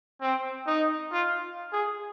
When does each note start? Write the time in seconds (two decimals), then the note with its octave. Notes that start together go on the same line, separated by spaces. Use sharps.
0.21 C4
0.67 D#4
1.12 F4
1.73 G#4